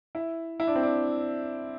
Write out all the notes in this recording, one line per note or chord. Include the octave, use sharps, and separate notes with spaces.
E4
E4
D4
C4
D4